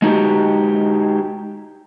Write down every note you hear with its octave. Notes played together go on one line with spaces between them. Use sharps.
G#3 D#4 F#4 G4